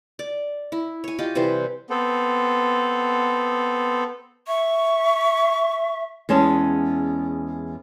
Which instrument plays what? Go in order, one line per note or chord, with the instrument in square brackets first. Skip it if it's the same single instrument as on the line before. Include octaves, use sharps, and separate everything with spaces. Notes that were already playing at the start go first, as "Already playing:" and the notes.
[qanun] D5
E4
C#5 G#5
F4 G4 D#5
C3 E3 G3 C5
[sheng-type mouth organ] B3 C4 A4
[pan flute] E5 [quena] C#6
[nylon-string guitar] E2 G#3 C#4 A5